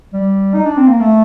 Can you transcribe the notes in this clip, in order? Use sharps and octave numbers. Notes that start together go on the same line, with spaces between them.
G3
D#4
D4
C4
A#3
A3